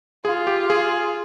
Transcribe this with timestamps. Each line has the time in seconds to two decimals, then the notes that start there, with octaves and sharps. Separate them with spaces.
0.25 F4 G#4
0.47 G4
0.70 G#4